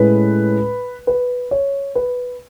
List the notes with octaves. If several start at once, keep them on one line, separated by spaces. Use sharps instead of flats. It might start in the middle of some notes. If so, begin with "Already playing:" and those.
Already playing: A2 G#3 C#4 B4
B4
C#5
B4